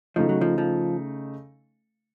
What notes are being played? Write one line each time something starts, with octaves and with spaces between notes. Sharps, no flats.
C#3 F3 A3 D#4
F#3
F3
F3